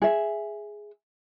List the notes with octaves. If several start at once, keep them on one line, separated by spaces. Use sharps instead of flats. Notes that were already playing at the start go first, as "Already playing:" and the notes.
G#4 E5